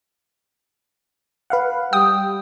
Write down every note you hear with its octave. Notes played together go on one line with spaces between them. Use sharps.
B4 F5 F#5
G3 G5 D#6